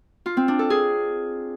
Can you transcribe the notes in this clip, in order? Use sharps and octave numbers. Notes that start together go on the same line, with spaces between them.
F4
C4
D4
A4
G#4